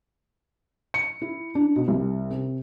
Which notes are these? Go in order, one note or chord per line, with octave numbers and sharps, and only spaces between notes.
C#7
E4
D4
B2
C2
C3